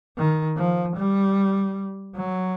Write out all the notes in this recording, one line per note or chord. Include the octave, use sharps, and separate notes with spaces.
D#3
F3
G3
F#3